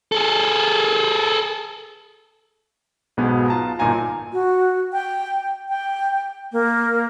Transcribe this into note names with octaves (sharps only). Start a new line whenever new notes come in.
G#4 A4
B1 G#2 B2 G#3 B3 G#4
F4 A5 A#5
G1 A#2 D#4 F4 G#5 A#5
F#4
G5
G5
A#3